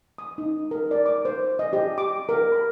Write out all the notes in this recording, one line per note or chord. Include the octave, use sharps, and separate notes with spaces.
D#6
D#4
A#4
D5
D6
C5
D#5
G4
D6
A#4
B5